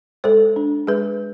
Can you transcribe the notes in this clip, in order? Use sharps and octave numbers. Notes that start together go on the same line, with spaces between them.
G#3 A4 C5
D4
G#3 G#4 B4